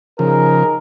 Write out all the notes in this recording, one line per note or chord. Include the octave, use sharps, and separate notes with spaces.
C#3 F3 D#4 G#4 A#4